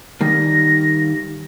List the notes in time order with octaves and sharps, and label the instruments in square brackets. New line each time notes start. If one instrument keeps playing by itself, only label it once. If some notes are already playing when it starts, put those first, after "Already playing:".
[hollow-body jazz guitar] D#3 G3 A#3 [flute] A#6